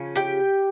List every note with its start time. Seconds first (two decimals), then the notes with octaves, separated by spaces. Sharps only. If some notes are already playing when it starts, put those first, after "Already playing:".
Already playing: C#3 F3 C#4
0.16 G4 G5